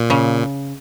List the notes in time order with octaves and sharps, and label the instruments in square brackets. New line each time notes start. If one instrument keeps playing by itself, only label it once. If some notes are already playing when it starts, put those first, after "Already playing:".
Already playing: [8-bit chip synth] A#2
[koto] C#3